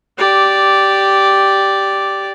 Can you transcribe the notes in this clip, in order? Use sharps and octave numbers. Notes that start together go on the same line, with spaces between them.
G4 D5